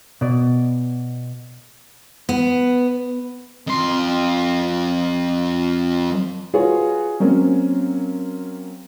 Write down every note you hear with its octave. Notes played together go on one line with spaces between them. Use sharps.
B2 D5
B3
F2 C6
F4 F#4 G#4 B4 C#5
F#3 A#3 C4 C#4